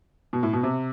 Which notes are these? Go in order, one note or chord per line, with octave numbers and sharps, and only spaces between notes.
B2
A2
B2
C3